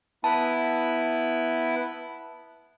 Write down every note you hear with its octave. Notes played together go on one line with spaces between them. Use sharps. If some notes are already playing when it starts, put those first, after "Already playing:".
B3 E4 A5